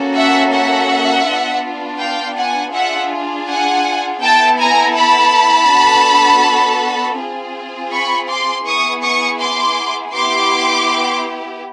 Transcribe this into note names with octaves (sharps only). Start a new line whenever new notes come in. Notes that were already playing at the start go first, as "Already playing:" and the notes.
Already playing: A#3 C#4 F#4 A4
E5 F#5
E5 F#5
B3 D4 F4
F5 G5
F#5 G#5
D4 F4 G#4 E5 F#5
F#5 G#5
B3 E4 A4 G5 A5
G#5 A#5
A5 B5
B3 D4 F#4 A4
C4 F4 G#4
B5 C#6
C6 D6
B3 E4 G#4 C#6 D#6
C#6 D#6
C6 D6
B3 E4 G4 C6 D6